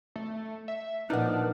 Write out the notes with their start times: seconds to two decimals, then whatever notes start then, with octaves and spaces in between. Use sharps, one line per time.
0.16 A3
0.68 E5
1.10 A#2 F3 D4 D#4 A#4 B4 F#5